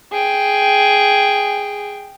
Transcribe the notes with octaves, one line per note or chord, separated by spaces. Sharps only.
G#4 G5